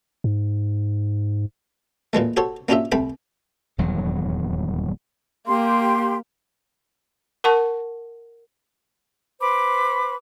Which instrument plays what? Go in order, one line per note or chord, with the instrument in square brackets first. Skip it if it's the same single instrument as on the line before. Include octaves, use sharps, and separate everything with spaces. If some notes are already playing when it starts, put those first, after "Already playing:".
[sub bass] G#2
[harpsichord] A#2 E3 G#3 A3
F#4 G4 A4 C5 C#5
A#3 C#4 D4 F4 G4 E5
C2 A3 G5 B5
[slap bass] D#1 E2 G2 F#3
[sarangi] A#3 [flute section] G4 C6
[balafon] A#4 F#5 A5 C#6
[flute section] B4 C5 B5 D6